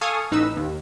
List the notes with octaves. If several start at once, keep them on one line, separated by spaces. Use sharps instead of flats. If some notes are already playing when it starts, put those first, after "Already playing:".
A4 F5 G#5 C#6 D#6 F6
A1 D#4 B4 E6
D#2